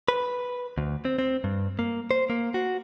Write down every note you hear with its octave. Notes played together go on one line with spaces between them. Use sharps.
B4
D2
C4
C4
G2
A#3
C5
A#3
F#4